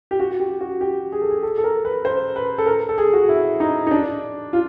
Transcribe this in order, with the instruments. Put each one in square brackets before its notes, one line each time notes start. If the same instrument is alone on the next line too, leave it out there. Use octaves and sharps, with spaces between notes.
[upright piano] G4
F#4
G4
F#4
G4
G#4
A4
G#4
A4
A4
A#4
B4
C5
B4
A4
A#4
A4
G#4
F#4
E4
D#4
D#4
D4
F4